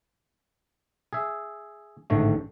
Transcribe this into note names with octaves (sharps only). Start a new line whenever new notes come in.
G#4 E5
A1 G#2 D3 D#3 A3